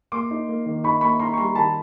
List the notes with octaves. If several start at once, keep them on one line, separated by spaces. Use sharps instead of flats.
A#3 C6 D6
D#4
A#3
D#3
D#4 B5 C#6
A#3 B5 C#6
D#4 A#5 C6
C#6
G3 A#5 C6
D#3 A5 B5